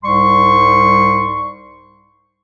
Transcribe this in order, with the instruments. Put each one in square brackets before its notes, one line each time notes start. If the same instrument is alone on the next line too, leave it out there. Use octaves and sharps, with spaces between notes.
[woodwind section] C2 G#2 G3 C6 C#6